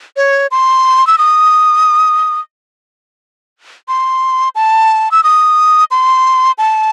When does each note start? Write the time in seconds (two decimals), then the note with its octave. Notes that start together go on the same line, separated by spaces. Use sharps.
0.17 C#5
0.51 C6
1.07 E6
1.18 D#6
3.88 C6
4.55 A5
5.11 E6
5.24 D#6
5.91 C6
6.58 A5